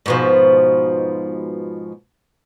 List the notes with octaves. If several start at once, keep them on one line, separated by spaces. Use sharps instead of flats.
G#2 B2 F3